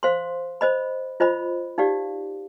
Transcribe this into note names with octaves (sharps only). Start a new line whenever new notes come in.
C5 F5 C6
C5 D#5 B5
F4 C5 D#5 B5
D#4 G4 D5 F5